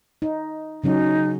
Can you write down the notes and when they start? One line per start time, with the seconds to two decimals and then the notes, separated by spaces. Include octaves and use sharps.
0.22 D#4
0.84 C#3 F#3 C#4 D#4